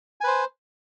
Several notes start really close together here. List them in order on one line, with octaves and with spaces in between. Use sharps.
G#5 B4 C5